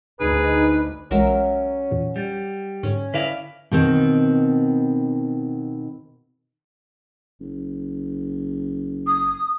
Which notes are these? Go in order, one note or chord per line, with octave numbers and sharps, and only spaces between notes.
D2 D#4 G#4 B4
B1 E3 F#3 G#3 C#4 A#4 E5
E2 A#2 E3
G3 G6 A6
G#2 D3 C#4
D3 E4 B4 D5 F5
B2 D#3 C4
F#1
D#6